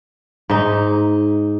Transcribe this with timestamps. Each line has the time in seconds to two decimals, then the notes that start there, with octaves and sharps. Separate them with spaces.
0.50 G#2 D#4